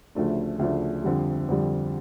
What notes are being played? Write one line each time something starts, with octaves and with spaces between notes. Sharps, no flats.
D2 C#3 F3 A3 D4
D2 C#3 F3 A3 D4
F2 D3 G3
F2 D3 G3